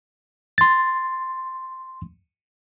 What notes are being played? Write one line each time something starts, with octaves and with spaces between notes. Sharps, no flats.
C6 A6